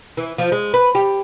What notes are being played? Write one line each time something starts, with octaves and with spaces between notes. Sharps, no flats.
E3
F3
G#3
B4
G4